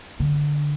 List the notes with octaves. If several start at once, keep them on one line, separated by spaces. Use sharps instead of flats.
D3